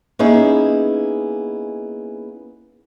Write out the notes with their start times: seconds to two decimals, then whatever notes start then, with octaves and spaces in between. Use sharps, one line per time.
0.19 A#3 B3 C#4 D#4 E4 G#4